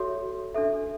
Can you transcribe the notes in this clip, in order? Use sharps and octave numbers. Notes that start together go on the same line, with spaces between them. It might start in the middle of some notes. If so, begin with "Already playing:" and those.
Already playing: F#4 A4 C#5 E5
D4 A4 E5